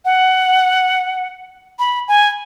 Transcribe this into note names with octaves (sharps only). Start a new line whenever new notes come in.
F#5
B5
G#5